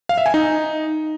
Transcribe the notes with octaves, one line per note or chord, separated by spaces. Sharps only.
F5
E5
G#5
D#4